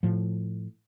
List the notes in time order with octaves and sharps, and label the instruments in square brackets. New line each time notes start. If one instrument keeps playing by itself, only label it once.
[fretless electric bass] A2 F3